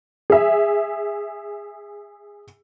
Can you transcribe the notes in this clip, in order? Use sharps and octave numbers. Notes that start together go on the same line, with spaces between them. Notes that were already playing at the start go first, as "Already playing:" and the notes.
G#4 E5